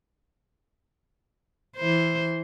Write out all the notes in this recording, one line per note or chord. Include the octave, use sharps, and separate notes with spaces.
E3 C5